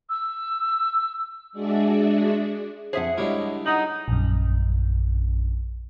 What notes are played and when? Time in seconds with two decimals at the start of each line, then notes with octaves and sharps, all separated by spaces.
0.09 E6
1.53 G#3 D4 F#4 G#4 D5 E5
2.93 F2 G#4 C5 E5 F#5
3.18 D3 G3 G#3 E4 C#5 D#5
3.66 D#4 F#5 D#6 F#7
4.08 A#1 F#2